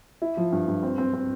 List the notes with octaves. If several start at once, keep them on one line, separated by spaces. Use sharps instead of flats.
E4
F3
G2
G2
C4
C4
C4